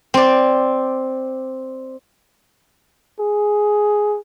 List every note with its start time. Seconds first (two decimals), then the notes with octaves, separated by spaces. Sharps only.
0.14 C4 D5
3.20 G#4